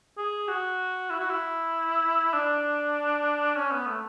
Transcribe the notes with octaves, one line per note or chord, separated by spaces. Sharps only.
G#4
F#4
E4
F#4
E4
D4
C#4
B3
A3